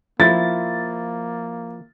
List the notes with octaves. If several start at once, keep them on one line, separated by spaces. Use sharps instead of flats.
F3 A#3 E4 A6